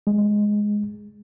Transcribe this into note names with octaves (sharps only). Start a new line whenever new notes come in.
G#3